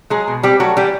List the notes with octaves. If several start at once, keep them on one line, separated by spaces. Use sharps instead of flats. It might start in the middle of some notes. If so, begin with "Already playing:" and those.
F#3 G#3 G#4
B2
G3 C4 G4
F#3 A3 F#4
E3 G3 G4